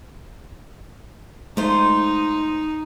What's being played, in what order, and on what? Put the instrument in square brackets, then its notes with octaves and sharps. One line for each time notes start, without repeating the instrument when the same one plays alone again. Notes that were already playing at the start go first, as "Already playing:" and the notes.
[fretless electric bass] G#3 A3 [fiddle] D#4 [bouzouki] F4 C5